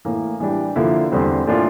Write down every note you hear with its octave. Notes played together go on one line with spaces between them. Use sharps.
A2 E3 A#3
E3 G3 D4 G4
D3 F3 A#3 E4
E2 D3 G3 C4
A2 E3 A#3 D4 F4